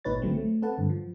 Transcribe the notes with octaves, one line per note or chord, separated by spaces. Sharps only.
G#1 A#2 D#4 B4 C#5 A6
C2 D3 F#3 A3 C4
A3
C4 A4 B4 F#5 A5
G2 D3
F3